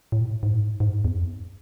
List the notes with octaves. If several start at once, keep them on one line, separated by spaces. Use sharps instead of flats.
A2
A#2
G#2
A2
G#2
E2
F2